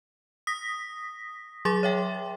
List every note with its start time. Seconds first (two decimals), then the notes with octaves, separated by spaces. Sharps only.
0.47 D#6 A#6 B6
1.65 F#3 G#4 C6 D6 A6
1.83 C#5 E5 G5